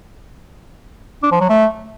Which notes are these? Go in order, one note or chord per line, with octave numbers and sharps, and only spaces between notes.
D4
F3
F#3
A3